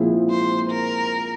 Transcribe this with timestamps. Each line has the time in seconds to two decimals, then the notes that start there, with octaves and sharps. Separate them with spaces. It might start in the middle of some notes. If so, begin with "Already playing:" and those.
Already playing: A#2 F3 G#3 C4 E4
0.30 C5
0.71 A#4